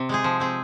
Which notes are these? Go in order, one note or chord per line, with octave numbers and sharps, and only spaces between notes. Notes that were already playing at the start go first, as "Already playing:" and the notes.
Already playing: C3
G#3 D#4 G#4
F3
C4 G#4